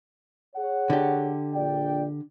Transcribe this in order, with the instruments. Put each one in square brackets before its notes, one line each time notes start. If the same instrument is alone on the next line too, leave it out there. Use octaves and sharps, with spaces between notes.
[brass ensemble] G#4 C#5 F#5
[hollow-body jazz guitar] D3 G4
[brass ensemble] A#1 D5 G5